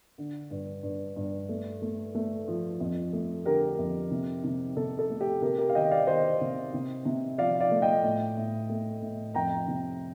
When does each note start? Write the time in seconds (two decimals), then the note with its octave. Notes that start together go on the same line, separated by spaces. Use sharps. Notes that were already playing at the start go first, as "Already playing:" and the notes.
0.18 D3
0.51 G2
0.83 G2
1.16 G2
1.49 A3
1.82 A3
2.15 A3
2.48 F3
2.80 F2
3.13 A3
3.46 D3 G4 A#4
3.79 F2
4.11 C3
4.44 C3
4.76 C3 A4
4.99 A4
5.10 A3
5.21 G4
5.42 C3 G4 A#4
5.58 G4 A#4
5.69 F5
5.75 D#3 D#5 G5
5.91 D5 F5
6.07 D#3 C5 D#5
6.41 C3
6.74 C3
7.05 C3
7.38 F3 D5 F5
7.60 D5 F5
7.71 A3
7.82 D#5 G5
8.03 A2
8.37 A2
8.69 A3
9.02 A2
9.34 F2 G5 A#5
9.67 C3